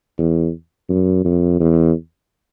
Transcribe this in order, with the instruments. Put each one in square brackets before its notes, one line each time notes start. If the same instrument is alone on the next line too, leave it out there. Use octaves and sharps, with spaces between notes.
[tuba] E2
F#2
F2
E2